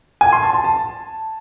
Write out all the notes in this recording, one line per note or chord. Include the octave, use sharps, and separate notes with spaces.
G#5
C6
A5
A5
A5